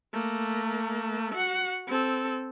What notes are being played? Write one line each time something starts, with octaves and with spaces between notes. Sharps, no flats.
A3 A#3
F#4 F#5
C4 A4